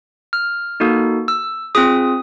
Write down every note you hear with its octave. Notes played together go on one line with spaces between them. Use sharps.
F6
A#3 D#4 F#4 A4
E6
C4 F4 G#4 D#6